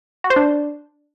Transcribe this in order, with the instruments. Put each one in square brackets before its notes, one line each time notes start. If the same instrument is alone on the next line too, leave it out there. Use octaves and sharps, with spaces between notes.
[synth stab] F#4
C5
D4